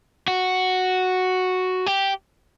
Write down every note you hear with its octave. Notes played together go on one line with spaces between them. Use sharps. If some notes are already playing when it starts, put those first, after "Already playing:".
F#4
G4